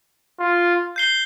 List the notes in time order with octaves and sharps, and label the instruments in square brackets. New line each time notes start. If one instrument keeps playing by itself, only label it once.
[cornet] F4
[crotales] G6 C7 G7